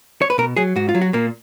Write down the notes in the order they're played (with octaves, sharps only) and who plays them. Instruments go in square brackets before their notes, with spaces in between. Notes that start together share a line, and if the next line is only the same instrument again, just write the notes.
[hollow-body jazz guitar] C#5
B4
B2 A#4
F#3 G#4
G#2 F#4
F4
F#3
F#4
A#2 A#3